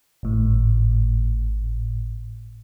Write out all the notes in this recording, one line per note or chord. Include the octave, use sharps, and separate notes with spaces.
G#1 A2